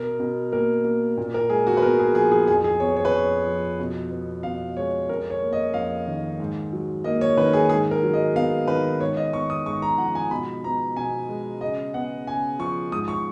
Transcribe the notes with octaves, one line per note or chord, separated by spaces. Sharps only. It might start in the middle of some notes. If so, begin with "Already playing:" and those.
Already playing: B2 A#4
B2
A#3 A#4
A#3
A#2
A#4
G#3 G#4
F#4
B4
B3 A#4
G#4
F3 G#4
G#4
F2 G#4
G#4
B3 C#5
C#5
B4
F2 C#5
F3
B2
B3
B2 F5
G#3 C#5
F2 A#4
C#5
A#3
D#5
F2 F5
D#3
G#2
F#3
A#3 D#5
C#5
D#3 B4
G#4
G#2 G#4
A#4
F#3
D#5
B3 F5
D#3 B4
G#2 C#5
D#5
B3 C#6
D#6
G#2 C#6
A#5
F3 F#5
G#5
B2 B5
B3 A#5
B2 G#5
G#3
C#3 D#5
B3 F#5
C#3 G#5
F3 C#6
G#2 D#6
C#6